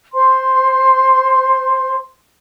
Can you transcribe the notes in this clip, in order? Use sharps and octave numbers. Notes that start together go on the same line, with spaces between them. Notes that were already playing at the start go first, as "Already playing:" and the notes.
C5 C6